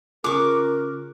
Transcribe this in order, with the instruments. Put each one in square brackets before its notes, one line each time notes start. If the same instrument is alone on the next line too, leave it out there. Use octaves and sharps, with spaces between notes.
[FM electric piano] C#3 C#4 G#4 [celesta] F4 F#6 [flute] A#4 [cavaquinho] C#6 D6